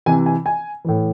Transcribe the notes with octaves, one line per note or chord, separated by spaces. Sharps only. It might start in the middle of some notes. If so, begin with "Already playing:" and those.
C3 E3 G#5
G#5
G#5
A2 E3